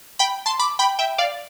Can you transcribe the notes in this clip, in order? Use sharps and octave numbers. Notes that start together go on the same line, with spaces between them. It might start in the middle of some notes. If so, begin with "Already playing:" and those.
G5 B5
A5 C6
B5 D6
G5 B5
E5 G5
D5 F5